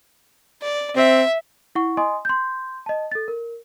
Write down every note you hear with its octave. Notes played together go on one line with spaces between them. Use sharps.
D5
C4 E5
E4 F#5 C#6
D#5 G#5 C6 D#6
C6 G6
D#5 A5
A4 A6
A#4